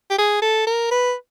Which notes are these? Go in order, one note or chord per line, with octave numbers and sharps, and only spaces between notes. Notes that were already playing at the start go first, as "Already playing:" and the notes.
G4
G#4
A4
A#4
B4